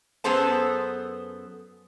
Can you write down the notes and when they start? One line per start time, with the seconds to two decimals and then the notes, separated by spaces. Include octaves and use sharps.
0.24 F#2 B3 G#4 A4 C5 A5